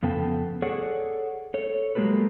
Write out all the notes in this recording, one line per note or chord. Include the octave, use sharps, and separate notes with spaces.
F2 C#3 B3 A4 G5 A5
G#4 A4 C#5 D5 F#5
A4 C#5
F#3 G#3 A#3 G4 A4 B4